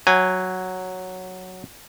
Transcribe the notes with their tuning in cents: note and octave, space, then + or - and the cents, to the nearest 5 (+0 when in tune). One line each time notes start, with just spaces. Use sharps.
F#3 +0 G#5 -20